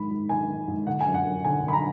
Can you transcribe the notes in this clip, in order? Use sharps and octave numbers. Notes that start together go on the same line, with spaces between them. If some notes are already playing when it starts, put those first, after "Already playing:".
Already playing: G#2 D#3 B5
G#2
D#3 G#5
D#3
G#2
D3 F#5
G#5
F#2
F#5
F#2
D3 G#5
D3
B5
A#5